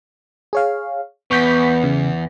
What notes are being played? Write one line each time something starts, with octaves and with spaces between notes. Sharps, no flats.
G#4 C#5 F5
E2 B3 C#6 G6 B6
C#3